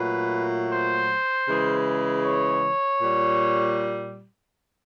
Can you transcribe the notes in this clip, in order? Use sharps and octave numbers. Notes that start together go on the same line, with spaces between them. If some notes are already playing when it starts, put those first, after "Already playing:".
Already playing: A#2 F#3 A3 B4
C5
C#3 E3 G#3
C#5
A#2 G3